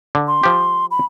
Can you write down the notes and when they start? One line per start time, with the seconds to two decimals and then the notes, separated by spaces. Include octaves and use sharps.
0.15 D3
0.28 C6
0.43 F3 G4
0.91 B5